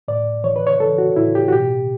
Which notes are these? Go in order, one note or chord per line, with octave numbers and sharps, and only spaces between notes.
A2 D5
E3 C#5
B4
C#5
E3 A4
F#4
A2 E4
G4
F#4
B2 G4